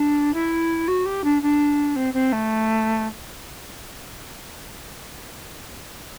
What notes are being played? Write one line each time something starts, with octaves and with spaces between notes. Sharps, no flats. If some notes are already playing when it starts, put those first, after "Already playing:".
Already playing: D4
E4
F#4
G4
D4
D4
C4
C4
A3